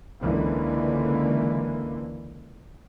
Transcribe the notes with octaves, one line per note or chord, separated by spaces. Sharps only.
C#2 D3 E3 A#3